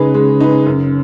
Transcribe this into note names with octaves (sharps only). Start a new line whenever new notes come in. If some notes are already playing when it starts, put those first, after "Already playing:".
Already playing: C#3 G#3 D#4 G#4 B4
G#3
D#4 G#4 B4
F#2